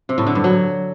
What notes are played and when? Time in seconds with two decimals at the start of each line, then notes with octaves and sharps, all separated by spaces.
0.09 C3
0.18 A2
0.27 D3
0.35 G2
0.44 F#3